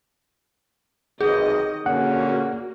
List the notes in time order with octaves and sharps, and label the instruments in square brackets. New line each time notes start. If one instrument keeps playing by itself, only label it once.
[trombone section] B1 C3 [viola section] D#3 D#5 [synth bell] G#4
[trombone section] A#2 D3 C#4 [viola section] A#3 F#4 [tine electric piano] F#5